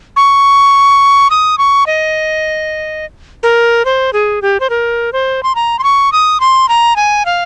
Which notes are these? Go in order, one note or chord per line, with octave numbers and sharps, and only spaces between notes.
C#6
D#6
C#6
D#5
A#4
C5
G#4
G4
C5
A#4
C5
C6
A#5
C6
C#6
D#6
C6
A#5
G#5
F5